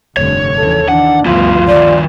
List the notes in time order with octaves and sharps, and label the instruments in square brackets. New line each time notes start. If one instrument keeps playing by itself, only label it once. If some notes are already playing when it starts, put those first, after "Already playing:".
[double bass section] F1 G2 D3 [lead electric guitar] C#5
[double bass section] D#2 C#3 E3 [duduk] A4
[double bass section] D#3 E3 [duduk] D4 [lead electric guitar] F#5
[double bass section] D2 G2 B3 [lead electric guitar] F3 E4 [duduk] F4
[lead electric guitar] D#3 F3 [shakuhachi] D5